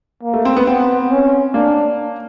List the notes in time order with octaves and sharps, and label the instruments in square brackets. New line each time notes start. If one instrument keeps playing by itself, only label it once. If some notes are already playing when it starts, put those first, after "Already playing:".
[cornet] A#3
[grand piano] A3
C4
B3
[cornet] B3 [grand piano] C4
[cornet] C#4
[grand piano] A#3 [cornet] D4